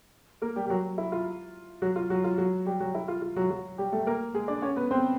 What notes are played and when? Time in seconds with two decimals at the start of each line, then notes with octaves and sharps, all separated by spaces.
0.42 A#3 A#4
0.56 G3 G4
0.66 G4
0.70 F#3 F#4
0.98 E4
1.12 F4
1.82 F#3 F#4
1.96 F4
2.10 F#3 F#4
2.24 F4
2.38 F#3 F#4
2.66 G3 G4
2.80 F#3 F#4
2.95 E4
3.08 F4
3.22 F4
3.36 F#3 F#4
3.50 F#3 F#4
3.78 G3 G4
3.92 A3 A4
4.07 A#3 A#4
4.34 G#3 G#4
4.48 D4 D5
4.62 C#4 C#5
4.76 B3 B4
4.91 C4 C5